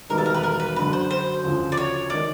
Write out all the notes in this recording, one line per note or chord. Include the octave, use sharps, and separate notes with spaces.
E1 D#2 D#3 G3 A#4
A4
A#4
B4
A#4
B4
F#2 D3 F#3 B4
C5
C5
D2 C#3 F3
D5
C#5
D#3 D5